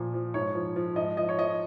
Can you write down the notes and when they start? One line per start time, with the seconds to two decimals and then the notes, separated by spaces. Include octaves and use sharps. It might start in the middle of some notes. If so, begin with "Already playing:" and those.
Already playing: A#2 F3
0.14 F3
0.34 G#2 C#5
0.55 F3
0.76 F3
0.96 G#2 D#5
1.17 F3 D#5
1.29 C#5
1.38 F3 D#5